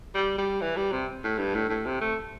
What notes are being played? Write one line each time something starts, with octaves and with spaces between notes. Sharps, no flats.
G3
G3
E3
G3
C3
A2
G2
A2
A2
C3
A3